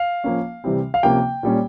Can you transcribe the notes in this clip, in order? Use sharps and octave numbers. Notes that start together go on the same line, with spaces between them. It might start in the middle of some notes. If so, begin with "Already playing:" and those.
Already playing: F5
F3 A#3 C#4
C3 E3 G3 C4
F5
C3 F3 A#3 C#4 G5
A#2 G3 C#4